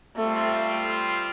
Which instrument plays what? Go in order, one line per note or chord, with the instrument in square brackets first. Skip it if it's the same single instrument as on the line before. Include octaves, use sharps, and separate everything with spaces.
[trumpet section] G3 C4 F4 [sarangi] A3